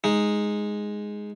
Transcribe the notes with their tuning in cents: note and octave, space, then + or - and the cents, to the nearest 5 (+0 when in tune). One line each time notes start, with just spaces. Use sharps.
G#3 +0 D#4 +0